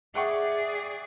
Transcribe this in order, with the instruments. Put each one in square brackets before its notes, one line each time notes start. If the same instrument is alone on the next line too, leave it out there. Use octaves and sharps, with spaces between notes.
[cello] G#4 D5 [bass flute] E5 [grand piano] F#5 G5 C#6